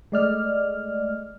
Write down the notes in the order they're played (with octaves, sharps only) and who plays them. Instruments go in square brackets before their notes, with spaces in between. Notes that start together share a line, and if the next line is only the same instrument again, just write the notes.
[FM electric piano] G#3 A3 D5 D#5 F6